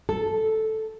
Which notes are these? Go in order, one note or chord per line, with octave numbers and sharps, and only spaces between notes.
A4